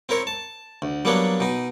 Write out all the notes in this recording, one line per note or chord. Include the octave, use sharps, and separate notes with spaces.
C4 E4 A#4 C#5
A5
D2
F#3 G3 A#3 B3 D4 C#5
B2 D#4